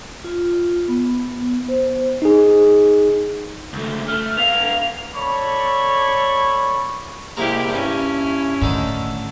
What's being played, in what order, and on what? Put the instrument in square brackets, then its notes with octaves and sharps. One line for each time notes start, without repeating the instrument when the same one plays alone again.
[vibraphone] F4
B3
C5
[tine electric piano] D#4 G#4
[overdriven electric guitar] C#2 A3
[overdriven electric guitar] A3 [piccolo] F6
[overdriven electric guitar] B3 F5 [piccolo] F7
[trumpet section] A4 C#5 D5 A5 B5 C#6
[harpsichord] C2 G#3 A#4 [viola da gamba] A#3 E4 G4
[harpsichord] G2 [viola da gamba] C#4 E4
[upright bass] A2 [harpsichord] D3 D#3 A4